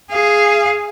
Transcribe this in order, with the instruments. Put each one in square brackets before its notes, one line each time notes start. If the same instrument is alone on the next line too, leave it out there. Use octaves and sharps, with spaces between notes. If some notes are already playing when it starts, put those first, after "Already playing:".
[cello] G#4 F5